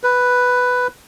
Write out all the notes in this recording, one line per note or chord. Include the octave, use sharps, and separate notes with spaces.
B4